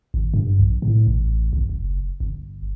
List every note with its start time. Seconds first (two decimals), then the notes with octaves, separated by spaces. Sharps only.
0.14 G#1
0.34 G2
0.59 A#1
0.82 A2
1.07 A1
1.53 B1
1.69 F#1
2.20 G1